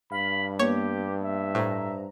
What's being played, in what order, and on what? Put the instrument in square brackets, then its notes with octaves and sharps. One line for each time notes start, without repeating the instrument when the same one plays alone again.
[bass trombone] G2 [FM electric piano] F5 [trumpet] B5
[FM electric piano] A#3 B3 [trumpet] G4 [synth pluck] C#5
[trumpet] E5
[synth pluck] A2 [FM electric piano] C5 A#5